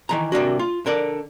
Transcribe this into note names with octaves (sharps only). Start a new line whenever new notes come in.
D#3 E3 A#5
C3 A#3 D4 F#4
F4
D3 A#4 D5